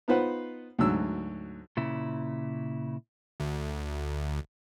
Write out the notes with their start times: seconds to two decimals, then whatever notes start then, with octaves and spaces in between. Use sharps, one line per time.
0.08 B3 D#4 F4 B4 C5 F#5
0.79 D2 G#2 F#3 E6
1.77 A#2 C#3 E4
3.40 D2